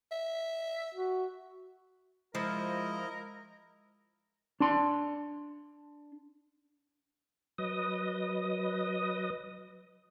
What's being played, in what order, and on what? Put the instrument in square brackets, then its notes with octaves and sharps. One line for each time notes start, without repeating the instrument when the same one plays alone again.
[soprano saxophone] E5
[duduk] F#4
[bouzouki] F3 [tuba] G#3 [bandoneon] E4 D#5 [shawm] A#4
[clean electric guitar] D4 A5 C6
[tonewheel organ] F#3 B4 D#5 D#6